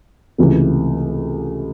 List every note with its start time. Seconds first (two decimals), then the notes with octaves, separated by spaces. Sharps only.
0.38 C#2 C3 E3 A3